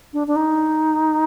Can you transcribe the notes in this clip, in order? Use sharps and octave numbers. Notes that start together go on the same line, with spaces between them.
D4
D4
D#4